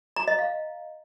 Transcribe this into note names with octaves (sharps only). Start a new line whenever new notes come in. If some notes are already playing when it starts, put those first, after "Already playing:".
A#5
D#5
F5